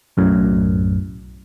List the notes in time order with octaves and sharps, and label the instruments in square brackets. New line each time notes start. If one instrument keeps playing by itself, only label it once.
[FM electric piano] B1 F#2 A2